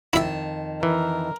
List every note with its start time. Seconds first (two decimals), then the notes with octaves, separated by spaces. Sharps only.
0.13 F2 D#3 E4 E5 A5
0.83 E3 A#4